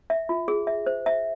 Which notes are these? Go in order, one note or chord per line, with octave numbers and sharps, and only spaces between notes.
E5
F4
G#4
E5
C5
E5